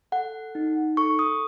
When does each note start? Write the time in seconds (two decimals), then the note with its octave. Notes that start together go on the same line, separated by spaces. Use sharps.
0.12 A4 F#5
0.55 D#4
0.97 A4 C#6
1.19 D#6